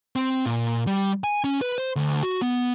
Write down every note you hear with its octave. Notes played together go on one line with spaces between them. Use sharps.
C4
A#2
G3
G#5
C#4
B4
C5
D2
F#4
B3